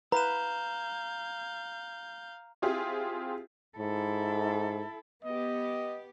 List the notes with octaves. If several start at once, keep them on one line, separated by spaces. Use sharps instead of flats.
B4 F5 A#5 G6 E7
C4 E4 F4 G4 G#4
G#2 E4 A4
B3 G4 D#5